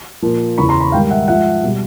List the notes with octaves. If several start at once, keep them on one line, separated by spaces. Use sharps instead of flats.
A#2 F3
E2 C#3 E3 B5 C#6
A#5 C6
B5 C#6
G#2 D#3 G3 F5 G5
E5 F#5
G#2 F3 E5 F#5
B2 G3